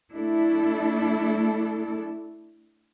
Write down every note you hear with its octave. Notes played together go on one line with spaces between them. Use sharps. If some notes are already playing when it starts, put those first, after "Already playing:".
A3 D4 E4 A4